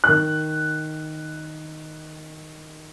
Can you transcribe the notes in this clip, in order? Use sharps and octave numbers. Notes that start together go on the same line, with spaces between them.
D#3 F#6